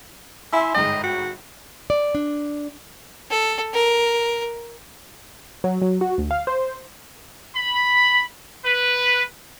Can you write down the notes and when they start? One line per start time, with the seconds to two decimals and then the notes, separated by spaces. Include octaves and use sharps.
0.53 E4 E5 G#5 C6
0.74 G1 G#2 D#5 G5
1.04 F#4
1.90 D5
2.15 D4
3.30 A4
3.74 A#4
5.64 F#3
5.82 F#3
6.01 F#4
6.18 D2
6.31 F5
6.47 C5
7.55 B5
8.64 B4